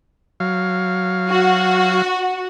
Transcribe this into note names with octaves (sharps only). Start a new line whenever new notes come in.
F#3 F5
F#4